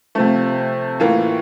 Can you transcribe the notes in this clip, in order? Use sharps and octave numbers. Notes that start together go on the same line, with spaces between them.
C3 F3 A3
A2 E3 A#3 F4 A#4